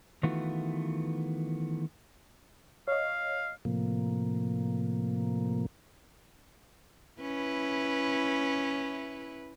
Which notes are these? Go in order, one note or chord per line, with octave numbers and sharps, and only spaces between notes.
D#3 E3 A3 B3 F4 F#4
C#5 D#5 F5
A2 C3 F3 A#3
C#4 E4 B4